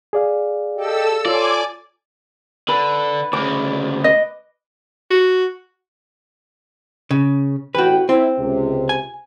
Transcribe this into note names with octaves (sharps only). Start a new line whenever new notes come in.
G#4 D5 F5
G4 A4 D#5 G5 E6
F4 A4 C#5 D5 G#5 C6 D6
D3 B4
D2 C#3 D6
D#5
F#4
C#3
A1 F#4 B4 G5
C4 E4
C#2 C3
G#5